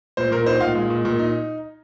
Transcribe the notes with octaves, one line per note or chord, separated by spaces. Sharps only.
A#2 C5
A#2 A#4
D#4 C5
A#2 F5
G#3
A#2
A#2
D#4